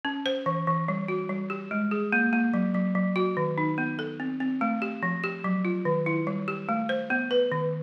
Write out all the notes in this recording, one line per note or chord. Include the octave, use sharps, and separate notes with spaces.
C#4
C5
E3
E3
G3
F#4
G3
G4
G#3
G#4
A#3
A#3
F#3
F#3
F#3
F#4
D#3
D#4
B3
A4
C4
C4
A3
G4
F3
G4
F#3
F4
D#3
E4
G3
G4
A3
C5
B3
B4
D#3